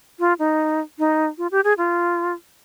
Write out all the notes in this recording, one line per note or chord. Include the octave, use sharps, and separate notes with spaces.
F4
D#4
D#4
F4
G4
G#4
F4